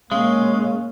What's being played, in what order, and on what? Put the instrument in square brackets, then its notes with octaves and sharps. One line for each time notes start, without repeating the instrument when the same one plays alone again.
[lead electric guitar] G#3 [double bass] A#3 C#4 [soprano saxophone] F5